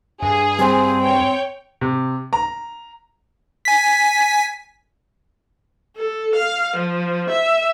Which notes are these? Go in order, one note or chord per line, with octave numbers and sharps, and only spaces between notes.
G2 G#4
G3 C4 C5
C#5 G5
C3
A#5
G#5 B6
A4
F5
F3
E5